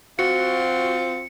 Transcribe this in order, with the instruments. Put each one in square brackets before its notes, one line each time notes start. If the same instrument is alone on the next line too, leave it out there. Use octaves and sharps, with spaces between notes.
[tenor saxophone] C4 [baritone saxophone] F4 [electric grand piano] F#4 [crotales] C#7